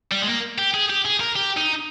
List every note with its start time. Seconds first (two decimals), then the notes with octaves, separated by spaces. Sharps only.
0.12 G3
0.22 G#3
0.28 A#3
0.58 G4
0.74 G#4
0.90 G4
1.05 G#4
1.20 A#4
1.36 G4
1.57 D#4